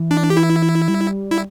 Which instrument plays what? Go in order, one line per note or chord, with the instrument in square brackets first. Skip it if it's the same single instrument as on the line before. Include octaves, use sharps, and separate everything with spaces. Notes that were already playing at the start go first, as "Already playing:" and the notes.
Already playing: [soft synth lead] E3
[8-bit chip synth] D4
G4
E4
[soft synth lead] G3
[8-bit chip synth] E4